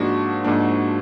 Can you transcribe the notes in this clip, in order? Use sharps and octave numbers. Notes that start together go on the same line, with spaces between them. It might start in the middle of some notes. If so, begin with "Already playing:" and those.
Already playing: G#2 F3 A#3 D4 F#4
G#2 F3 A#3 D4